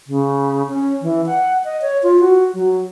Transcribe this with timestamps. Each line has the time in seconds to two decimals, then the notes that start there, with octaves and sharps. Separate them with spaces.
0.07 C#3
0.69 C#4
1.02 E3
1.26 F#5
1.64 D#5
1.82 C#5
2.03 F4
2.20 F#4
2.54 F#3